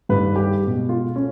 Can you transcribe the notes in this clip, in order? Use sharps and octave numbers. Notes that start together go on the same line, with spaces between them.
G2 D#3 G3 B4
G4
B2 G#3
F4
A3 C#4